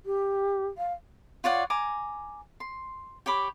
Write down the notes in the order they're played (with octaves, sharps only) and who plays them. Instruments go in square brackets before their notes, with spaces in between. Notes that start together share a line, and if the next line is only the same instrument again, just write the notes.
[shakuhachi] G4
F5
[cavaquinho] F4 C#5 D5 F#5
G#5 A#5 D6
C6
G4 C#5 B5 D6